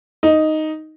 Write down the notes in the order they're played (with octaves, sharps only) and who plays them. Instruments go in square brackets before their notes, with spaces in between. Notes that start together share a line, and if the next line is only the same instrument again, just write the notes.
[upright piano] D#4